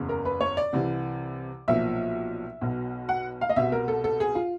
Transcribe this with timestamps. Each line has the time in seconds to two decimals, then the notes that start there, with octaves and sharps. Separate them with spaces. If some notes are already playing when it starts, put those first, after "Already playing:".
Already playing: F#1 E2 C#3
0.09 A#4
0.25 B4
0.41 C#5
0.57 D5
0.73 C2 C3 E3
1.68 B1 A#2 F3 E5
2.61 B1 B2
3.09 F#5
3.41 F5
3.49 D#5
3.56 C2 B2 E5
3.72 A#4
3.88 A4
4.04 A4
4.20 G#4
4.35 F4